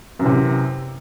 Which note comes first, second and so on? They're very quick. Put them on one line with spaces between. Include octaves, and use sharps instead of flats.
F#2 E3 C3